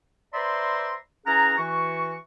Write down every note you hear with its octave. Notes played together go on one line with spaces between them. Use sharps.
B4 C5 D5 E5 A#5 C6
E3 C#4 G#4 F#5 A#5
E3 F#4 C#6